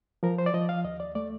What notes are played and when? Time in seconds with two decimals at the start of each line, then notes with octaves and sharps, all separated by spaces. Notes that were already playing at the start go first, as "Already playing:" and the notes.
0.23 F3 A#4
0.38 C5
0.46 D5
0.54 F3 D#5
0.69 F5
0.85 D#2 D#5
1.00 D5
1.15 A3 D5